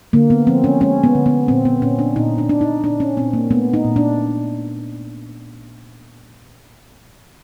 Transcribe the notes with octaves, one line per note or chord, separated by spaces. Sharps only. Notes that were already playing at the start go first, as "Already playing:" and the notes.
D3 A#3
B3
F3 C4
C#4
G#3 C#4
B3
D3
B3
A#2 C4
B3
A#2 C#4
D4
A#2 D#4
D4
A#2 D4
D#4
A#2 D4
C#4
A#2 C4
A#3
A3 B3
D#4
A#2
D4